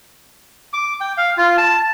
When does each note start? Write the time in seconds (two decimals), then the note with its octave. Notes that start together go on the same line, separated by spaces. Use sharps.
0.73 D6
1.01 G5
1.18 F5
1.37 F4
1.58 A5